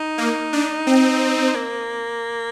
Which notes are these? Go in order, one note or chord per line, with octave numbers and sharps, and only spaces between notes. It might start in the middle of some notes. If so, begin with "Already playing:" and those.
Already playing: D#4
A#3
D4
C4
A#3